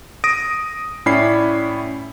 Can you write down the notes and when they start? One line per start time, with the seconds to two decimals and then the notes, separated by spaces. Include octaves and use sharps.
0.24 D#6 A#6 D7
1.06 A2 C#4 E4 D5 B5 C7